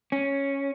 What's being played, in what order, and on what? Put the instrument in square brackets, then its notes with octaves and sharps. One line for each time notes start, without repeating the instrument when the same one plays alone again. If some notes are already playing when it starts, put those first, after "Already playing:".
[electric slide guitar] C#4